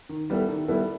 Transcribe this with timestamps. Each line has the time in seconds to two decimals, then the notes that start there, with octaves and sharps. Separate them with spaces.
0.09 D#3
0.30 G3 B3 E4 A4
0.49 D#3
0.68 G3 B3 E4 A4